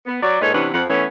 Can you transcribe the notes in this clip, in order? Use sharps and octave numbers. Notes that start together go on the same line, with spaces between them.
B3
F#3 D5
A#2 G#3 D#4 A4 B4 C#5
C3 E3 B3 C#4 D4 B4
F2 F3 F#5
E3 A3 B3 C#4